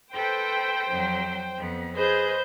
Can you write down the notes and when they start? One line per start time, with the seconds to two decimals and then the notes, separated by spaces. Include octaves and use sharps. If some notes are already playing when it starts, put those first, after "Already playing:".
0.13 A4 B4 C5 G5
0.87 F2 F#3
1.58 F2 B3
1.96 G#4 B4 C5 D#5 G6